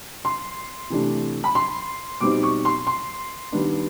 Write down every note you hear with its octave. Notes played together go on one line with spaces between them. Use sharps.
C6
C3 E3 A3 D4
B5
C6
B2 G3 C4 D#4 D6
C#6
C6
C6
D#3 G3 B3 D4